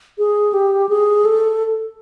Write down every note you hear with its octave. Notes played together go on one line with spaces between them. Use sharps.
G#4
G4
G#4
A4